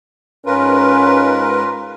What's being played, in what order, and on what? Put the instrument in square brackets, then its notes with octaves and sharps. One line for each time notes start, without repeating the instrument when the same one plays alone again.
[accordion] G#2 A#4 B4 [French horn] C#4 [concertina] F4